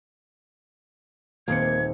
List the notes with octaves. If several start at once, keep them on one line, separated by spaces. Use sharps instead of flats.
D#1 A#3 C4 G#6 C#7